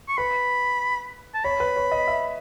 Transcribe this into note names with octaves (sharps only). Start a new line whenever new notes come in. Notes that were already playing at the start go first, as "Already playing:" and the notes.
C#6
B4 B5
A5
C#5 B5
B4
C#5
D#5
E5